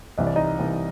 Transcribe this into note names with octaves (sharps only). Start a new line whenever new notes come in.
C2 C3 E3 D#5
D5
D#4 D#5
C2 C3 E3